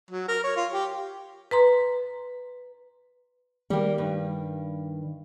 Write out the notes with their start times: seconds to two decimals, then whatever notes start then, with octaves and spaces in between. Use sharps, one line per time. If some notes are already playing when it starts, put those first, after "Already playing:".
0.11 F#3
0.28 A#4
0.44 C#5
0.57 F4
0.73 G4
1.51 B4 A#5 C6
3.70 D#3 G3 A#3
3.98 G2